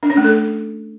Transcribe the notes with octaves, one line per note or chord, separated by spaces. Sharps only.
D4
C#4
A3
A4